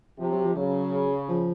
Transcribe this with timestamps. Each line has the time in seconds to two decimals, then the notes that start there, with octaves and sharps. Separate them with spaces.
0.19 C3 F3
0.32 F#3
0.43 F3
0.55 C#3 F#3
1.29 F3